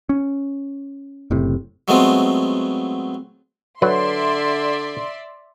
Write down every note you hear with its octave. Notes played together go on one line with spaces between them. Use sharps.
C#4
F#1 A2 C3
F#3 G#3 A3 B3 C4 F4
D3 F#3 B4 D5 E5 C6